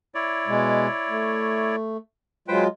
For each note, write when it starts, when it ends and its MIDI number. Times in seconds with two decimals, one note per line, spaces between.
0.15 1.76 64
0.15 1.76 73
0.15 1.76 74
0.48 0.87 47
0.48 0.87 56
1.09 1.97 57
2.48 2.67 54
2.48 2.67 56
2.48 2.67 65
2.48 2.64 71
2.48 2.64 72
2.48 2.64 79